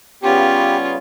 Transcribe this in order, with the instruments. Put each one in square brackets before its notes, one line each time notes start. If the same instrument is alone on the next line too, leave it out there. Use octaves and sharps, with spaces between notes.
[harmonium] C#3 G3 B3 [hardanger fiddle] C#4 F4 [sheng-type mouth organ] G4